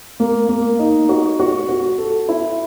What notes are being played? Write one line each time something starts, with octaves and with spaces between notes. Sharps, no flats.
A#3
A#3
D#4
F#4
F#4
F#4
A4
E4